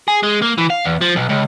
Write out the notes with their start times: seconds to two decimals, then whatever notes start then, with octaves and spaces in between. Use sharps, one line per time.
0.08 G#4
0.23 G#3
0.42 A#3
0.58 E3
0.70 F5
0.85 E2
1.01 F3
1.16 B1
1.30 C#2